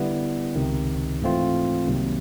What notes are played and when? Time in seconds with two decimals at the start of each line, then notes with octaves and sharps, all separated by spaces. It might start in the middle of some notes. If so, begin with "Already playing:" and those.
Already playing: D3 G3 B3 E4
0.55 C#2 C3 D#3
1.22 G#2 E3 A3 C4 F4
1.87 C2 C3 D#3 F#3 A#3